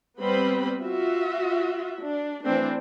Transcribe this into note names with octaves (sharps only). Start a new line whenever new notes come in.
G3 B3 C4 B4 C5 B5
F4 F#4 E5
D4
E3 A3 C4 D4